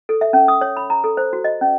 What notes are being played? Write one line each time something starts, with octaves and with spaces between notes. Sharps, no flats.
A4
E5
C#4
D#6
C#5
B5
A#5
A4
C5
F#4
D#5
C#4